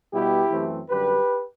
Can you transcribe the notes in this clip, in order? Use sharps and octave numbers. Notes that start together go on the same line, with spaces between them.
B2 G3 B3 E4 G4
F#2 E3 A3 C4
F#2 D3 G3 G4 B4